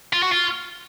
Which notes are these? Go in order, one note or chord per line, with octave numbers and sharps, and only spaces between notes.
F4
F#4
F4